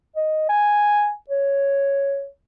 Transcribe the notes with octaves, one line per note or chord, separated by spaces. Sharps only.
D#5
G#5
C#5